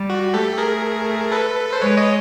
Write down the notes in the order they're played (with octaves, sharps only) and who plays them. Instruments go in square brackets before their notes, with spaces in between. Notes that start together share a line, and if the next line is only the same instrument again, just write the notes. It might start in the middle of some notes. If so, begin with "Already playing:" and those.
Already playing: [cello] G3
[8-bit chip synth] F#4
[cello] A3 [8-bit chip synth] G4 A4
[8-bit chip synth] G#4 A#4
A4 B4
C5
[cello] G#3 [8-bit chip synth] B4 C#5
[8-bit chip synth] C#5 D#5